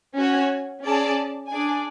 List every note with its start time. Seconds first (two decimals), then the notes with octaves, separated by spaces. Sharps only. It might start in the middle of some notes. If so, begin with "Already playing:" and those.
0.16 C#4 F#4 C#5 G#5
0.83 C#4 G#4 D5 A5
1.49 D4 G#4 D5 G#5